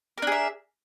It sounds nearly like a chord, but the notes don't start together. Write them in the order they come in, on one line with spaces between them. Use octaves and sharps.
A#4 D4 G#4 E5